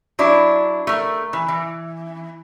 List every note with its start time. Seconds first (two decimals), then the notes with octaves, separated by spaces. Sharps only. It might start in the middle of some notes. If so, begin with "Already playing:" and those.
0.19 F#3 D4 E4
0.87 A3 A#4
1.33 E3
1.48 E3